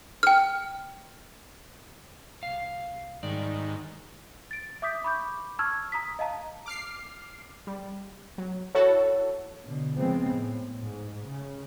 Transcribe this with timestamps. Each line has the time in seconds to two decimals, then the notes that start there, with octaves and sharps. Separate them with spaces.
0.23 G5 F6
2.43 C2 F5
3.23 G#2 D#3 G3 D5
4.51 A6 D7
4.82 E5 D6 D#6 G6 B6
5.04 B5 C#6 D6 G6
5.59 A5 C#6 E6 F6 G#6
5.92 A#5 D#6 B6
6.19 D#5 F5 A5 A#5
6.66 D6 F6 C7
7.67 G3
8.38 F#3
8.75 E4 F#4 A4 C#5
9.65 B2 D3
9.97 C#3 F3 G#3 B3 C4
10.33 A2
10.81 G#2
11.27 C#3